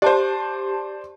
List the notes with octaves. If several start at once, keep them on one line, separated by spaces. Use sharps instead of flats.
G4 C5 D5 A5